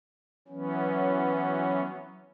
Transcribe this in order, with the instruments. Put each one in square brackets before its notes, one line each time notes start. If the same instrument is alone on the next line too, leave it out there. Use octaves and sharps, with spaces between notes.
[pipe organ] E3 F#3 B3 C#4